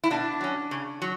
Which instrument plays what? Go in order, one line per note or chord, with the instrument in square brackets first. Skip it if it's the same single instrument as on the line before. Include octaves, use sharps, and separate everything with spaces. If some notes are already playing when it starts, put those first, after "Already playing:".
[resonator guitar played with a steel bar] E4
B2 D4
F#3 C#4
C#3
F#3